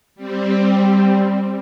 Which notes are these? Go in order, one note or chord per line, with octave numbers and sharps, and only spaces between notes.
G3 C4